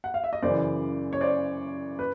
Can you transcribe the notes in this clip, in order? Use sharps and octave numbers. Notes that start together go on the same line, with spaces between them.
F#5
F5
E5
D#5
F#2 C#3 E3 C5 D5
C#5
C5 D5
B4